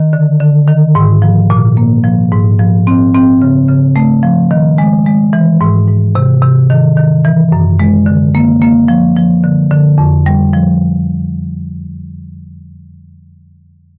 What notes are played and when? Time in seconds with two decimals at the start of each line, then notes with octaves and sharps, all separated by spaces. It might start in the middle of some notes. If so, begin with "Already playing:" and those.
Already playing: D#3
0.13 D3
0.40 D3
0.68 D#3
0.95 G#2
1.22 F3
1.50 A#2
1.77 A#3
2.04 F3
2.32 G#2
2.59 F3
2.87 C4
3.15 C4
3.42 C#3
3.69 C#3
3.96 A3
4.23 F3
4.51 D#3
4.78 G#3
5.06 G#3
5.33 E3
5.61 G#2
5.87 G#2
6.15 C3
6.42 C3
6.70 D#3
6.97 D#3
7.25 E3
7.52 F#2
7.80 G#3
8.06 D3
8.35 A#3
8.62 A#3
8.88 F3
9.17 F3
9.44 D3
9.71 D3
9.98 F2
10.26 G3
10.53 F3